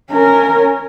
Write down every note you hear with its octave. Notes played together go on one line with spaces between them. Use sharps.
C#4 A#4